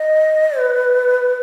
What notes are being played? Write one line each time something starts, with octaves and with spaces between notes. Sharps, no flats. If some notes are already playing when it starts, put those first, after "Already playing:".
Already playing: D#5
B4